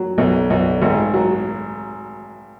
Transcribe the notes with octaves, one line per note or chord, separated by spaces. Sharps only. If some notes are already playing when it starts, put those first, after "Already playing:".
Already playing: F#3
B1
B1
G#1
F#3